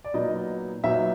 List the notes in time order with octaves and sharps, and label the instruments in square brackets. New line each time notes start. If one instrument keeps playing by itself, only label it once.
[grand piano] D5
A#2 F#3 B3 D#4 D#5
A#2 F#3 B3 D#4 E5